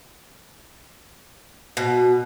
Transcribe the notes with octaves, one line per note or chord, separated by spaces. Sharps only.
B2